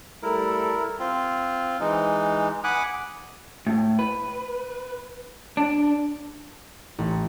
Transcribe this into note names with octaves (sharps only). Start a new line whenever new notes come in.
G3 A3 E4 A4 A#4
C4 F4
E3 G#3 D#4
F#5 G#5 B5 D6 D#6 F#6
A2
B4
D4
A1